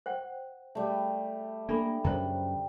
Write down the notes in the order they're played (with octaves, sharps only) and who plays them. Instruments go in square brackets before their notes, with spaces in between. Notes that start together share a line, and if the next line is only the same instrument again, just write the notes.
[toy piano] C5 F#5 G5
[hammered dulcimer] G3 A3
[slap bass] A#3 [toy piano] D4 A4 B5
[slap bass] F#2 C#3 [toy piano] C5 A#5